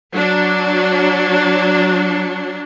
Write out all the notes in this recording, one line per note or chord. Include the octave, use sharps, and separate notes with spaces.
F#3 D4